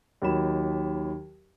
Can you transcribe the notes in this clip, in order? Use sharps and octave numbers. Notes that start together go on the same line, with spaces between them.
D#2 D#3 F#3 B5 E7